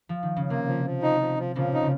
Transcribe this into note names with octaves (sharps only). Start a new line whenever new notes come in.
F3
D#3
C#3
C3 A#3
F3
F3
D#4
F3
F3
A#2 C#3 F3
D#4
C#3